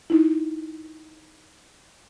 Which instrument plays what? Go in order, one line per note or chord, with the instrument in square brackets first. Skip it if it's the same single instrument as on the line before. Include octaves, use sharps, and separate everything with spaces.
[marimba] D#4 E4